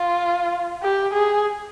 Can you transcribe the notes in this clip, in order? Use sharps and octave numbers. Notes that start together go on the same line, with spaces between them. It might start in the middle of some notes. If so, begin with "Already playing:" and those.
Already playing: F4
G4
G#4